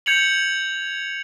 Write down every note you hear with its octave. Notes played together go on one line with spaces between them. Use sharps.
G6 G#6 C#7 F7 F#7